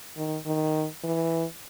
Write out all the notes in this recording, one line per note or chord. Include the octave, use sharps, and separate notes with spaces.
D#3
D#3
E3